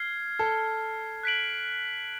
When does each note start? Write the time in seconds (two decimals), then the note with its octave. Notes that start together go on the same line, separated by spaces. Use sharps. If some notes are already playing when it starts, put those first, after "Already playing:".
Already playing: F6 G#6 C7
0.39 A4
1.23 F#6 B6 D7 F#7